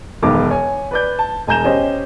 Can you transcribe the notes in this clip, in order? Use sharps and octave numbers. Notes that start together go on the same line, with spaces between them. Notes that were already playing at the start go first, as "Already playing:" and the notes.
E1 B1 D#3 B3 D6
C#5 G#5
B4 D5 G6
A5
E1 G#5 A#5 G6 E7
C#4 G4 C5 D#5